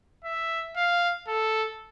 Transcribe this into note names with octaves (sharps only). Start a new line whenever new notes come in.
E5
F5
A4